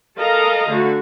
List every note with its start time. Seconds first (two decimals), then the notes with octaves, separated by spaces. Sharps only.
0.19 A4 A#4 D#5 F5 A#5
0.69 D3 A3 F#4